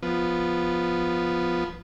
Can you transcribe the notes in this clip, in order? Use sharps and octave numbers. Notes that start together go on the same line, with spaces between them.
F3 B3